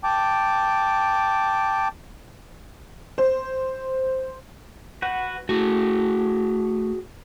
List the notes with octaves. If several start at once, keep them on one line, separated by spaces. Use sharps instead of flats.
G5 A5 D6
C5
F#4 B4 F#5
A3 F#4 G#4